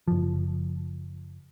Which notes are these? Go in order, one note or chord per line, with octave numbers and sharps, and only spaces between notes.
F#1 F3